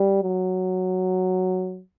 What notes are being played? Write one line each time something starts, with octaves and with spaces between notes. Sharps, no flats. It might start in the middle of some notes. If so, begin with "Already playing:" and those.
Already playing: G3
F#3